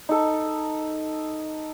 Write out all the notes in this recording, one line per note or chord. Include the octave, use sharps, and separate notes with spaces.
D#4 A4